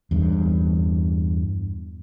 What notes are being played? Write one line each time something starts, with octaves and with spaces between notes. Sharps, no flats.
E2 G2